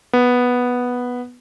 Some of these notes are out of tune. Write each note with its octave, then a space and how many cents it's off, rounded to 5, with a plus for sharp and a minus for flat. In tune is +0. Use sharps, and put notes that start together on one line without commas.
B3 -5